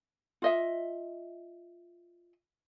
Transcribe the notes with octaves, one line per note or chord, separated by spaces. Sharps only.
F4 D#5 E5